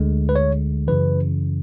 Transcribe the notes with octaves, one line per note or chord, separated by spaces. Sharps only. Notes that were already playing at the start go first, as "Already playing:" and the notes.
Already playing: D2 D3 G#3
B4
C#5
F#2 C#3 E3 B4